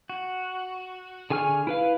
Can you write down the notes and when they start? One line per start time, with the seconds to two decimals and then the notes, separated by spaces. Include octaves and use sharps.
0.10 F#4
1.30 D3 G#4 G#5 C#6 F6
1.67 E4 B4 F5